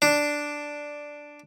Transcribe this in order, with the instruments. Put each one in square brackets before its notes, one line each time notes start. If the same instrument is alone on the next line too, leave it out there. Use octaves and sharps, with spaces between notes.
[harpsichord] D4